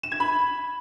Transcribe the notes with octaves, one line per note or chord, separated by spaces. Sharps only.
E7
G#6
B5